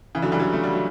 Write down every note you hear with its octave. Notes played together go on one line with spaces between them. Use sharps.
C#3 E3
D3 F#3
E3 G3
D3 F#3
A3
G3
F#3